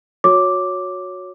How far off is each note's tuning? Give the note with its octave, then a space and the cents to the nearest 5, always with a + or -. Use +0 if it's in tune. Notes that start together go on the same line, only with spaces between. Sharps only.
F#4 -20 C#5 +0 D6 +0